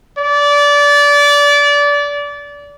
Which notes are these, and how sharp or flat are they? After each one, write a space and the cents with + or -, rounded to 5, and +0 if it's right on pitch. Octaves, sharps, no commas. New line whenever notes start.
D5 -25